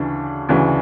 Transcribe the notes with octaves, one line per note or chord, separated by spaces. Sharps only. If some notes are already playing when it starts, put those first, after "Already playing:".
Already playing: D2 C#3 E3 D4
D2 C#3 E3